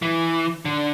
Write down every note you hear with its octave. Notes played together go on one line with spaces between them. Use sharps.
E3
D3